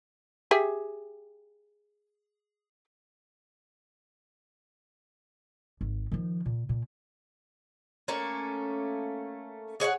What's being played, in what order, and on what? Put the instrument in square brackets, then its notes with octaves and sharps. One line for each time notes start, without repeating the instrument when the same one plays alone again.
[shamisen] G4 G#4 E5
[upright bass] G#1
D#3 F3
A#2
A#2
[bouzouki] A3 A#3 C#4
G#4 C#5 E5 F#5